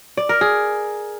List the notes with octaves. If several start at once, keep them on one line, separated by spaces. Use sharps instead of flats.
D5
A#4
G#4